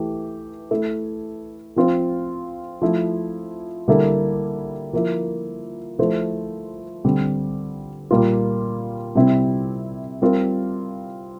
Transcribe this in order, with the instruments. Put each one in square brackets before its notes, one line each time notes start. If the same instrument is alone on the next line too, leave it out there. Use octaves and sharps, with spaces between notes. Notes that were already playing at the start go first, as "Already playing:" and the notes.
Already playing: [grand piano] E3 A3 E4 G4
A3 E4 A4
F3 C4 F4 C5
F3 A3 E4
D3 G3 A#3 E4 A4
F3 A#3 E4
F3 A3 E4 A4 C5
D3 G3 C4
A#2 G3 A#3 F4
C3 G3 C4 E4 G4
G3 C4 F4 A#4